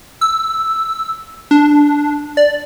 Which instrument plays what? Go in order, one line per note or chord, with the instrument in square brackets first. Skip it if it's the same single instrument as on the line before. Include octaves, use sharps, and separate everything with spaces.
[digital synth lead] E6
D4
D5